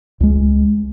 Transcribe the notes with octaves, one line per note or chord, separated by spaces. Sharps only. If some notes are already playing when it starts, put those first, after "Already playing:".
C#2 G#3